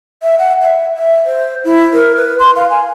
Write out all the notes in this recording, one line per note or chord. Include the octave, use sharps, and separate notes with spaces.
E5
F#5
E5
E5
C5
E4
A#4
B4
C6
F5
G#5